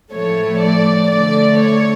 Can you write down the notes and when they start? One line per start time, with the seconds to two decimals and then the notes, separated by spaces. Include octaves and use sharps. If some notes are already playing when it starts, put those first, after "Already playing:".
0.12 A2 F3 A3 C#5
0.61 D5
1.09 D3 A3 D5
1.58 C#5